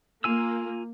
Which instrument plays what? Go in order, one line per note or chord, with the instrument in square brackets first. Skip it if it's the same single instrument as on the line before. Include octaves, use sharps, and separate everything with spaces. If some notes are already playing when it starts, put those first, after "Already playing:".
[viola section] A#3 [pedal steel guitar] F4 G#5 E6